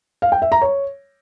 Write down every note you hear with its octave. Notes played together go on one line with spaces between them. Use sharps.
F5
G5
E5
A#5
C#5